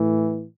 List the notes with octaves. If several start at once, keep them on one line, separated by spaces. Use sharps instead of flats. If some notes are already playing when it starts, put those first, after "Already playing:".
Already playing: A2 E3